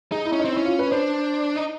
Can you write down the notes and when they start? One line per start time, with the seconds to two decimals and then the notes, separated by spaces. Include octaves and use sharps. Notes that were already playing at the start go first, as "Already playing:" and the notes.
0.11 D#4 G#4
0.25 E4
0.33 C#4
0.39 D#4
0.45 C4
0.52 E4
0.57 C#4
0.65 F4
0.79 B4
0.92 D4 C5
1.56 D#4